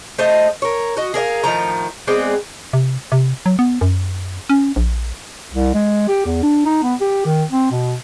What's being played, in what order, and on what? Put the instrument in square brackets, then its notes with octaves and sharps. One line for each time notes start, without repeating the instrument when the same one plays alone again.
[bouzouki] A3 C5 D#5
A#4 C#5
F#4 D#5
G#4 A#4 D5 F5
A2 D#3 F3 A#5
G#3 B3 C4 D5
[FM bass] C3
C3
F#3
B3
F#2
C#4
A#1
[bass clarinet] C2
G#3
G4
E2
D4
D#4
B3
G4
D#3
C4
B2